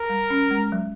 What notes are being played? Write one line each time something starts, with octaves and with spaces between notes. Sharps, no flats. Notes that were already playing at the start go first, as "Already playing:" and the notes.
Already playing: A#4
G3
C#4
G#3
F#3